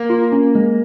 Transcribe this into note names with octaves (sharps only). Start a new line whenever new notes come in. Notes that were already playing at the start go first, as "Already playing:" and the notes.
Already playing: A#3
F4
C#4
G#3